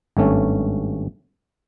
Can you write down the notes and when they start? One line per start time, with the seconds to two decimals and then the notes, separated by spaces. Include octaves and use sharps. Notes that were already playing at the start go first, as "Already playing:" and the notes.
0.17 G#1 G2 A3 C#4